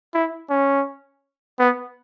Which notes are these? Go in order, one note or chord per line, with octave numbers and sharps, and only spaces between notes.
E4
C#4
B3